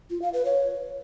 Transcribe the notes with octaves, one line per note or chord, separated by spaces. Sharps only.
F4
F5
B4
C#5